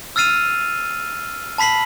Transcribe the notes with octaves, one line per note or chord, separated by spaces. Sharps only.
E6 F6 A6 C7 D#7 F7
A5 B5 B6 C7 F#7